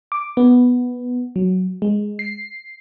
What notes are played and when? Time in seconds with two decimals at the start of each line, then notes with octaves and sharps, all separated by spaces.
0.12 D6
0.37 B3
1.36 F#3
1.82 G#3
2.19 C7